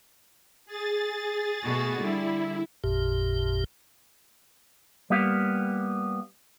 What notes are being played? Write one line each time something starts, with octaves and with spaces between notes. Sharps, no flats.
G#4 A6
B2 A3 F#4
D3 G3 E4
A1 F2 A#2 G4
G3 A#3 B3 G4 F5